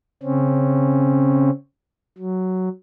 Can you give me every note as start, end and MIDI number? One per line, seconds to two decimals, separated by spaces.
0.23 1.50 49
0.23 1.50 60
0.23 1.50 61
2.18 2.68 54